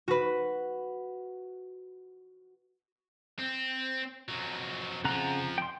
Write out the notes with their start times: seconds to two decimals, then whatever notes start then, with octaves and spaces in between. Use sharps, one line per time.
0.08 F#4 B4
3.39 C4
4.29 F2 F#3
5.04 F2 C#3 F3 F#5 A#5
5.58 G5 C6